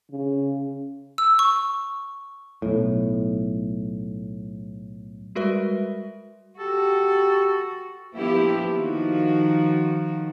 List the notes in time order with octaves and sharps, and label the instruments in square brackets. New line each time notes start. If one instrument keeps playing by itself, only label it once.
[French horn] C#3
[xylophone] E6
C#6
[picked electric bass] B1 A2
[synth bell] G3 G#3 F#4 A#4 B4 E5
[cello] F#4 [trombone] G4 [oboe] A4
[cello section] F3 A#3 B3 E4 G4
D#3 F3 F#4